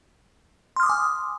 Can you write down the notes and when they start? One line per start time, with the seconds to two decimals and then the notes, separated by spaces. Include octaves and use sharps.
0.76 C6
0.80 F6
0.83 D#6
0.86 D6
0.89 G#5